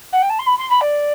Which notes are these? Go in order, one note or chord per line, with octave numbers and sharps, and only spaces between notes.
F#5
G5
A5
C6
B5
C6
B5
D5